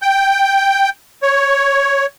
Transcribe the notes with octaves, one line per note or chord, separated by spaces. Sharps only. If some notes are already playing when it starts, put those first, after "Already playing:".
G5
C#5